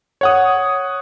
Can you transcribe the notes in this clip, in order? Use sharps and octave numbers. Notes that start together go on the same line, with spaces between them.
C#5 F#5 D#6